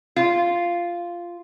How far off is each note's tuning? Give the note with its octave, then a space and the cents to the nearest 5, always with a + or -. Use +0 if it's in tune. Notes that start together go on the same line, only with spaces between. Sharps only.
F4 -5